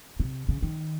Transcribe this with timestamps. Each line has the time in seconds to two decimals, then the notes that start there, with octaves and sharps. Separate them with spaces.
0.20 C3
0.49 C#3
0.62 D#3